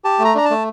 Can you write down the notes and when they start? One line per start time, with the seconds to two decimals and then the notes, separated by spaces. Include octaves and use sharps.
0.04 G4 A5
0.19 A3
0.25 A#5
0.35 D4 A#5
0.45 A5
0.50 A3